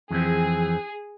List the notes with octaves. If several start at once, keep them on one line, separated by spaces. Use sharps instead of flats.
F2 E3 C4 G#4